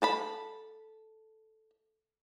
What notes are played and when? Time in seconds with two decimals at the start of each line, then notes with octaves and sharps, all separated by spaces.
0.02 A4 A5 B5